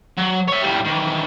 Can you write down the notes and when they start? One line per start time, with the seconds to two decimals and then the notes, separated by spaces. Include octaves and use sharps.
0.17 F#3
0.48 C#5 E5
0.62 A2 G3
0.85 D#3 E3